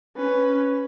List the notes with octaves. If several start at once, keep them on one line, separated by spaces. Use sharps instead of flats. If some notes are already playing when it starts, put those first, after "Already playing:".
C#4 B4